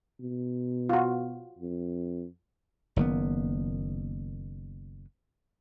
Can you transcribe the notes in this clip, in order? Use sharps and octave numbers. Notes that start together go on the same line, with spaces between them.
B2
F4 F#4
F2
F#1 D#3 A#3 B3